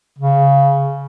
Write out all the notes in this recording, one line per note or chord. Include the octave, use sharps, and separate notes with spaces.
C#3